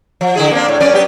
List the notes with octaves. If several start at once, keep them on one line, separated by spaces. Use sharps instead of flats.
F3
D3 E4 G#4
A#3 C4 D4
A2
F#2 C#4 D5
F#3 B3 G4